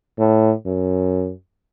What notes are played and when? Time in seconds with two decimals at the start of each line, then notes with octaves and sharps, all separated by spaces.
0.19 A2
0.66 F#2